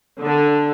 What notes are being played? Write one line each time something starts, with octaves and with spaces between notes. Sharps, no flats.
D3